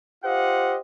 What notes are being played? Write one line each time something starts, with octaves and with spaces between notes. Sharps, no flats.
F4 G4 C5 D#5 F5 F#5